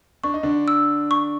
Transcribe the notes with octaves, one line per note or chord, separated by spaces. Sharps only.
D4 C#6
D#4
D3 D4
E6
C#6